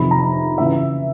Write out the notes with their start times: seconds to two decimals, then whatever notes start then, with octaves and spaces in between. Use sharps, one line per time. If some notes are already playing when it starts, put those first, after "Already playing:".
Already playing: F2 C3 D#3 B5
0.11 A#5
0.58 C#3 E3 E5